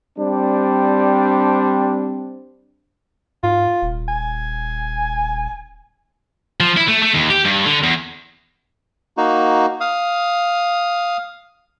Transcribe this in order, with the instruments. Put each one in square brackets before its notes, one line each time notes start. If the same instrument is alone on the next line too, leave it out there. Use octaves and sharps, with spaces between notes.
[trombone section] G3 C4 D4
[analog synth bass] G#2 [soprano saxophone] F4
[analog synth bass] D#1
[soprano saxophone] G#5
[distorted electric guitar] F3
E4
A3
A3
D#2
G4
G2
D3
E2
[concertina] A#3 D#4 F#4
F5 D#6